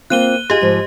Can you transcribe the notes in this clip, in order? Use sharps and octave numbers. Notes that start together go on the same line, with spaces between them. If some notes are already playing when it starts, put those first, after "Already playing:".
A#3 C4 F4 F#6 D#7 G7
F4 G4 G#4 D#5
G#2 F3